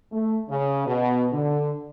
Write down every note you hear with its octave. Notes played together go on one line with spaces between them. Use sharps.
A3
C#3
B2
D3